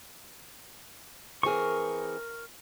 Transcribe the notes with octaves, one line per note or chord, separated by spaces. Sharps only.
E3 C4 G#4 A#4 C#6